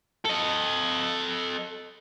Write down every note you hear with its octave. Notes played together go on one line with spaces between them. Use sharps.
A4 D#5